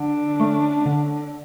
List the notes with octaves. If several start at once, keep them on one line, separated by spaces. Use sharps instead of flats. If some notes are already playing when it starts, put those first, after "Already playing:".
Already playing: D3 D4
A3 C#4
D3